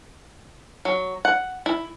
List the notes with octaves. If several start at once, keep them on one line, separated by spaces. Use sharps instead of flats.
F#3
F#5
E4